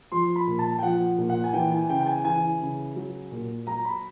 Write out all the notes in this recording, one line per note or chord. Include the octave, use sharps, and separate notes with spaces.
F3 C6
B5
A#2
A5
G5
F3 F#5
A#2
F#5
G#5
E3 G5
G#5
C#3 G5
G5
G#5
E3 G#5
C#3
F#3
A#2
F#3 A#5
B5